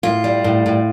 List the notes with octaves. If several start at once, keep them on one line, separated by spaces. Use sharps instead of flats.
A2 F4
G3
A2
A2